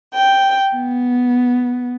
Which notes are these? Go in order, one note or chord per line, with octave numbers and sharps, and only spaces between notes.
G5
B3